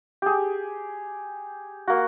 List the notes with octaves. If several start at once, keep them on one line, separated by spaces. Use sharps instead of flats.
G4 G#4
A#3 F#4